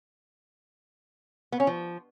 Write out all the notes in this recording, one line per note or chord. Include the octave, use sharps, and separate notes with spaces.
B3
C#4
F3